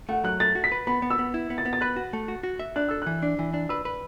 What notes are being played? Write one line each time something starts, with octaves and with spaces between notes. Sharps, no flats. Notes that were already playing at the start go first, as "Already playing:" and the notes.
A3 F#5
F#3 F#6
A3 A6
F#4
B6
B4
B3 B5
B3
E6
B3
E4
B3
A6
B3
A6
B4 F#6
F#4
A3
F#4
F#4
E5
D4 F#6
A4 E6
E3 F#6
D4
E3
D4
B4 E6
B4